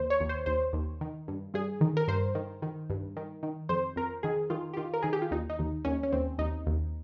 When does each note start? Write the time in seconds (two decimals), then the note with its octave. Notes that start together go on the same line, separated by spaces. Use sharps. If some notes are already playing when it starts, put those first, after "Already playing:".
Already playing: D#2 C5
0.10 C#5
0.20 D#2
0.29 C5
0.46 D#2 C5
0.73 D#2
1.01 D#3
1.28 G2
1.54 G2 G#4
1.81 D#3
1.97 A#4
2.08 G2 C5
2.35 D#3
2.62 D#3
2.90 G2
3.17 D#3
3.43 D#3
3.69 F2 C5
3.96 F2 A#4
4.23 D#3 G#4
4.50 D#3 F4
4.74 G4
4.77 D#3 F4
4.94 A#4
5.02 D#3 G#4
5.13 G4
5.22 F4
5.31 D#2 D#4
5.50 D#4
5.59 D#2
5.85 D#2 C#4
6.03 C#4
6.12 D#2 C4
6.38 D#2 D#4
6.67 D#2